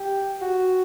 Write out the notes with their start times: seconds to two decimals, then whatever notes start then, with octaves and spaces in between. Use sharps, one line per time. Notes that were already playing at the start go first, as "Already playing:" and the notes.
Already playing: G4
0.41 F#4